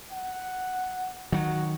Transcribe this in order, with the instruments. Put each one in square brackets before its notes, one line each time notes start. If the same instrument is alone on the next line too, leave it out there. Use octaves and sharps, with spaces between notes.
[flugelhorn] F#5
[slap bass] D#3 F#3 [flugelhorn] F#4